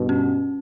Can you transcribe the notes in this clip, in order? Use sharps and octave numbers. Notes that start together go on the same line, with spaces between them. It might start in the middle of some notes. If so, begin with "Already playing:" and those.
Already playing: G2 B2
C#4